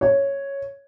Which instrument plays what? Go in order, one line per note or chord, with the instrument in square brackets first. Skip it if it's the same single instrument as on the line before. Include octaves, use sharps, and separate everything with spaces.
[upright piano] C#5